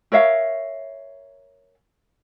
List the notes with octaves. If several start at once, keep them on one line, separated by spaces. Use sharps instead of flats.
A#4 C#5 E5 F5